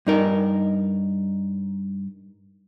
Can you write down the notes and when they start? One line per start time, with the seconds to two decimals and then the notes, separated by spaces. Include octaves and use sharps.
0.07 G2 D#4 A#4